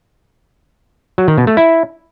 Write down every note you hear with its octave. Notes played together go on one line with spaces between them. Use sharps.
F#3
D#3
B2
A3
E4